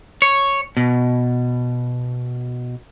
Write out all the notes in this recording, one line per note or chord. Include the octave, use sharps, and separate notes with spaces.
C#5
B2